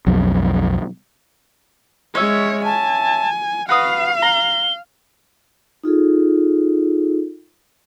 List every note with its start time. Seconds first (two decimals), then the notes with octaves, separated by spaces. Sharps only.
0.06 B1 F2 F#3
2.15 G#3 C#4 C#5 E5
2.65 G#5 A5
3.69 F#4 B4 F5 D#6 C7
4.22 A#5 G7
5.83 D#4 F4 G#4 A4